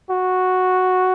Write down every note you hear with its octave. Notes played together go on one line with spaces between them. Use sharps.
F#4